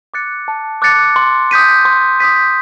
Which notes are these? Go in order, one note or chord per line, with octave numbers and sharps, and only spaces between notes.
D6 F#6 A6 C#7
A5
D6 F#6 A6 C#7
C6
D#6 G6 B6 D#7
C6
D#6 G6 B6 D#7